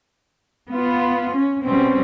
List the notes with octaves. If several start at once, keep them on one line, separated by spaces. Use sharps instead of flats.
B3 F4
C#4
B2 G3 C4 C#4